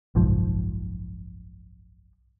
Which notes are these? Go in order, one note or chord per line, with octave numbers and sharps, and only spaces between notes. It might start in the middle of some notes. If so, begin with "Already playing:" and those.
F#1 B1 G#2 F3